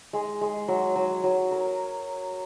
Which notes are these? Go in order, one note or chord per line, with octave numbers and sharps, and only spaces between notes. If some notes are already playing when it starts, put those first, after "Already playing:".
G#3
G#3
F#3
F#3
F#3
A#4